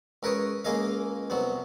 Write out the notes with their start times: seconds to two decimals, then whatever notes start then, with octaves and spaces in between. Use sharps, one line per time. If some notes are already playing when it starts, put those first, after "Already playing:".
0.23 C#2 A#4 B4 C#5 D#6
0.65 C#2 A#3 G#4 D#5 F5
1.30 C2 F#3 B3